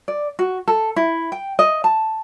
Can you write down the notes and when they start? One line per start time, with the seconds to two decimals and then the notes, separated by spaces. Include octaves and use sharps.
0.08 D5
0.39 F#4
0.68 A4
0.96 E4
1.32 G5
1.59 D#5
1.84 A5